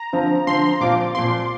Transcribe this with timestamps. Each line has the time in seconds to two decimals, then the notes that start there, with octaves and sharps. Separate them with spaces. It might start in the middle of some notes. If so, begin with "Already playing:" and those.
Already playing: A#5
0.13 D3 F3 C4
0.47 D3 F3 C4 C6
0.80 A#2 F3 C4 F4 D6
1.14 A#2 F3 C4 F4 C6